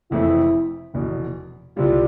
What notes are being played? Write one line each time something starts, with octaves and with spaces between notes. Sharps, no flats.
F1 F2 E3 A3 C4 E4
F1 E2 B2
C2 C3 G3 F4